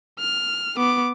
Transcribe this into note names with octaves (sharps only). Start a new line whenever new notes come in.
F6
B3 D6